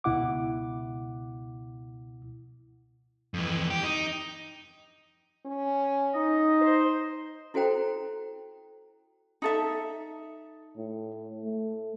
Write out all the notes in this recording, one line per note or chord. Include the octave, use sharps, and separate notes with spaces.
C#2 B2 E4 F#5 D6
F2 E3
G4
D#4
C#4
D#4 D#5
C5
E4 F#4 A4 C5 G5 A#5
D#4 A4 E5
A2
A3